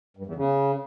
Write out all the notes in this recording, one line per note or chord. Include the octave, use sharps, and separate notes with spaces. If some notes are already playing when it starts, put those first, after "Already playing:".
G2
E2
C#3